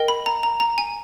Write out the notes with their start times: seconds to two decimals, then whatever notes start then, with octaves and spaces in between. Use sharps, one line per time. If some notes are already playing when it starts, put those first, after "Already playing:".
Already playing: A#4 D#5 G5
0.08 B5
0.26 A#5
0.43 A#5
0.60 A#5
0.78 G#5